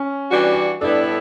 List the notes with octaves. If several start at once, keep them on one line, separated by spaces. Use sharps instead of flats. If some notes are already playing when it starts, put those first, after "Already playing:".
Already playing: C#4
E3 G3 D4 F#4
A2 G3 B3 D4 E4 A4